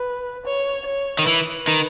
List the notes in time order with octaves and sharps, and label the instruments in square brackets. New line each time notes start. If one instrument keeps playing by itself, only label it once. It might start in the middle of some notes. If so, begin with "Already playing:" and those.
Already playing: [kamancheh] B4
C#5
C#5
[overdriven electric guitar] D#3
[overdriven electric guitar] E3 [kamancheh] B4
[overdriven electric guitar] D#3